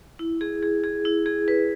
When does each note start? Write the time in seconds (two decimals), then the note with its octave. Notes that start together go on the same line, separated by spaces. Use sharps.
0.19 E4
0.41 G#4
0.63 G#4
0.84 G#4
1.05 E4
1.26 G#4
1.48 B4